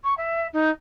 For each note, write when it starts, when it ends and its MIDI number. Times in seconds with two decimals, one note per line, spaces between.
0.04 0.14 85
0.18 0.47 76
0.53 0.70 63